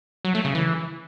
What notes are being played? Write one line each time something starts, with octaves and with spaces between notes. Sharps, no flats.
F#3
A3
C#3
E3